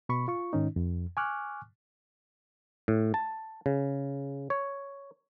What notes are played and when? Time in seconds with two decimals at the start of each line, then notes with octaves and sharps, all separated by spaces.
0.09 B2 B5 C#6
0.28 F4 C#6
0.53 G#2 D#3 C#4 D#4
0.76 F2
1.17 G#5 C#6 D6 F6 F#6
2.88 A2
3.14 A5
3.66 C#3
4.50 C#5